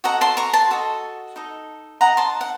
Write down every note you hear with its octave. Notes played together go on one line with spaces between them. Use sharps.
F#4 A4 D#5 F#5 A#5
A5 C6
A#5 C#6
A5 C6
F#4 A4 D#5
D#4 A4 D#5
D#4 A4 D#5 F#5 A#5
A5 C6
F#5